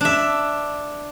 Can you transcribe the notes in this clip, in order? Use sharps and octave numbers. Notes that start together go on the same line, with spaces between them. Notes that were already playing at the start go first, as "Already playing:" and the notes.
D4 E5